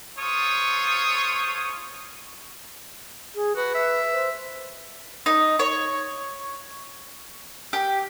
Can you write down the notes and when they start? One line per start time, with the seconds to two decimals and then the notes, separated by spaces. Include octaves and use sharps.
0.19 F4 A4 C5 C#5 D#6
3.35 G#4
3.56 F#4 B4
3.75 E5
4.13 C5
5.26 D#4
5.59 C#5
7.73 G4